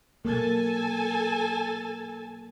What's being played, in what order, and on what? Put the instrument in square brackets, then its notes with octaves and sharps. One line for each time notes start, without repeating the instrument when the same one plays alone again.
[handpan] B2 F#3 A#3 [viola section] A4 G#5 A5